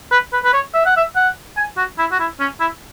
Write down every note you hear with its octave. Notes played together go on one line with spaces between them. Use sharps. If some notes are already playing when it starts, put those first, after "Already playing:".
B4
B4
B4
C#5
E5
F#5
E5
F#5
G#5
F#4
E4
F#4
E4
C#4
E4